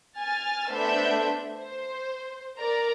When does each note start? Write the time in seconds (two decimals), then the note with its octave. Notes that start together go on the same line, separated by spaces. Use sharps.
0.19 G#5 F6 A6
0.71 A3 B3 D4 C5 E5 G6
1.59 C5
2.58 A#4 D5 A#5